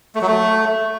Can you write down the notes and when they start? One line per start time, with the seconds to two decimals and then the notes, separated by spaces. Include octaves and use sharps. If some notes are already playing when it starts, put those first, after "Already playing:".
0.15 A3
0.21 F#3
0.27 A3